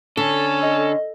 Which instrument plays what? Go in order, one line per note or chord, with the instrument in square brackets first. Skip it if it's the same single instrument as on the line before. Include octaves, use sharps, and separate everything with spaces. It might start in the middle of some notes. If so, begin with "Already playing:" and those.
[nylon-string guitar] D3 [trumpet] C#4 [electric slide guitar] A4
[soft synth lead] D#5